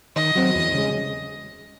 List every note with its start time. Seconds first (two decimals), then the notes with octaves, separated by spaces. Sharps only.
0.16 D#3 D#5
0.35 F#3 C4
0.55 E2
0.74 C#3 G#3